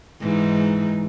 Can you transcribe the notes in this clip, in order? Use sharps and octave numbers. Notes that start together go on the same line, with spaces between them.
G#2 E3 D#4